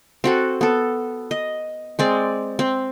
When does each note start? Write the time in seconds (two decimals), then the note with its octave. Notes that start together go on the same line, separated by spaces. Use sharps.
0.24 C4 F#4 A4
0.61 B3 A4
1.31 D#5
1.99 G#3 C4 D5
2.59 C4